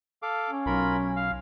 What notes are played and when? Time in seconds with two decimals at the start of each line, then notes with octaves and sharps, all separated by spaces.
0.22 A4 F5 D6
0.50 C#4
0.66 B1 F4 A#4 B5
1.16 F5